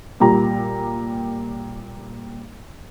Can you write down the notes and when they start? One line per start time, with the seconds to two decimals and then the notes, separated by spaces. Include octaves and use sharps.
0.20 A#2 G3 A#5